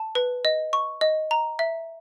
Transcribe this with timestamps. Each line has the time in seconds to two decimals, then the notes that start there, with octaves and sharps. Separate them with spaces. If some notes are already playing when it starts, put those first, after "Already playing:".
Already playing: A5
0.15 B4
0.45 D#5
0.73 C#6
1.01 D#5
1.31 A#5
1.59 E5